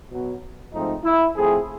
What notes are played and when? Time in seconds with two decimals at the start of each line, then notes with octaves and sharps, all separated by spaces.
0.11 B2 F#3 B3
0.73 G#2 F3 A3 C4 D#4
1.04 E4
1.36 A2 F3 A3 C4 G#4